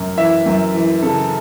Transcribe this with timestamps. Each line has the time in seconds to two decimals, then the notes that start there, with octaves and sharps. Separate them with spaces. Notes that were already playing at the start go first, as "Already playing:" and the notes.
Already playing: F#2
0.17 E3 E5
0.46 F#2
0.75 E3
1.02 C#3 A4